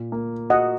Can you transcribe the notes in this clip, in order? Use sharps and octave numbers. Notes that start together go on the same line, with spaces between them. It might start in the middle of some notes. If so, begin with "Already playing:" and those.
Already playing: A#2
A#3
F#4 D#5 F#5